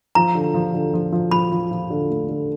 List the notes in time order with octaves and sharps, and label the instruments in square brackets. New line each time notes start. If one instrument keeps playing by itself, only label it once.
[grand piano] F3 [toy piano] A#5
[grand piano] D3
F3
D3
F3
F3
[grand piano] F3 [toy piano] B5
[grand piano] F3
F3
D3
A3
D3